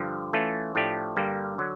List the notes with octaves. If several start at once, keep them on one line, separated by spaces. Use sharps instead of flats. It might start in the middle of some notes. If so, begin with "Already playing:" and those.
Already playing: G2 D3 F3
E3 A3 C#4 F4 A4
A2 F3 A3 D4 G4
G2 D3 G3 A#3
D3 F#3